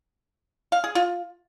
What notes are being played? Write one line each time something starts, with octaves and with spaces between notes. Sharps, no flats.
F5
G#4
F4